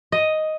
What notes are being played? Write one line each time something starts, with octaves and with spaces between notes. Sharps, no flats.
D#5